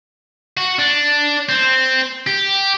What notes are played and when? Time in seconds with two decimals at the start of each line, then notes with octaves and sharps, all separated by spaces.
0.57 F#4
0.79 D4
1.49 C4
2.27 G4